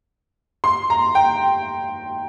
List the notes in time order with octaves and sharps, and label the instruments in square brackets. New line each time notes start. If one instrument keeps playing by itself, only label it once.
[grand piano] C6
A#5
G5